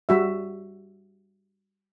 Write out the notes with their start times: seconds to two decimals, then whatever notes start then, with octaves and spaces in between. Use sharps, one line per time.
0.09 G3 F#4 E5